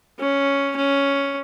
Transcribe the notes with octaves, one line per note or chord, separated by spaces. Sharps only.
C#4
C#4